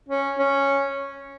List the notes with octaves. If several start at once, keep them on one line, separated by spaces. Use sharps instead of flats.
C#4
C#4